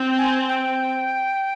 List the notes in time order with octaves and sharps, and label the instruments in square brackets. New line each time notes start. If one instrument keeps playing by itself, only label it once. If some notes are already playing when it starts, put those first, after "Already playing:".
Already playing: [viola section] C4
[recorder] G#5
G5